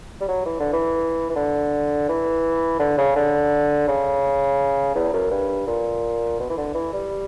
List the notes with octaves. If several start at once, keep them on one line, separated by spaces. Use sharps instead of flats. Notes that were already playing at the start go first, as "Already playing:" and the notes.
G3
F#3
E3
D3
E3
E3
D3
E3
D3
C#3
D3
C#3
E2
F#2
G2
A#2
B2
E3
D3
E3
G3